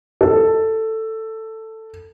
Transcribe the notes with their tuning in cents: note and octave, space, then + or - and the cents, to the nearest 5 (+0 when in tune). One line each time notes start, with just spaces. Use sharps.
A4 +10